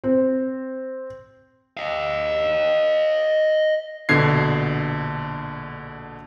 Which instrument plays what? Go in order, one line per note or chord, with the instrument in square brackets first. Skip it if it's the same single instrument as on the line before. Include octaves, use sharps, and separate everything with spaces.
[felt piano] C4
[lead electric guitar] D#5 F5
[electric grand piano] A#1 B2 D3 G#6 C7